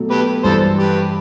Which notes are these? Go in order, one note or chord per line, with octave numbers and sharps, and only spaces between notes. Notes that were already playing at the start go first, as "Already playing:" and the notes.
Already playing: B2 F#3 A3
G4 B4
G2 E3 G3 A4 C5
G4 B4